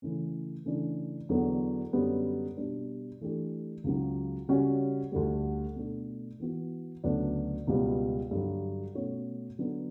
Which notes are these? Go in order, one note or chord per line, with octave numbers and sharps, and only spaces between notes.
C#3 E3 A3 C#4
C#3 E3 A3 D4
E2 D3 F#3 B3
F#2 D3 G3 B3
B2 G3 D4
E3 A3 D4 G4
C#2 C#3 F#3
C#3 G3 C#4 F#4 C#5
D2 D3 G3
B2 A3 D4
E3 B3 F#4
D2 C#3 F#3 B3 D4
C#2 B2 G3 B3
G2 D3 F#3
B2 A3 C#4 F#4 C#5
D3 F#3 B3 D4